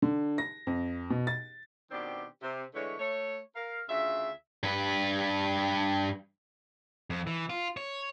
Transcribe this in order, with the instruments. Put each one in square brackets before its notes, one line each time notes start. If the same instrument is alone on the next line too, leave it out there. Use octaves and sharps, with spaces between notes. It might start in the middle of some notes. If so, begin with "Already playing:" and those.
[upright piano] D3
A#6
F2
B2
A6
[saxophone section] B2 D#3 B3 C4 D4 G4
C3
D3 E3 G#3 A3 C#5
A3 C#5
A#4 F5
D2 C#3 F4 E5
[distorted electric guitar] G2 B4
[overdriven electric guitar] F2
E3
F4
C#5